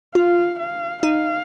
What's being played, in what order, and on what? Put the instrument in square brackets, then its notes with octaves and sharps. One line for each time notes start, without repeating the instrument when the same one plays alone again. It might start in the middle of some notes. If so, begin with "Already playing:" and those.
[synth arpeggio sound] F4 [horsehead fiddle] F5
[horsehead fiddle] F5
[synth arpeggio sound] D#4 [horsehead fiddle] F5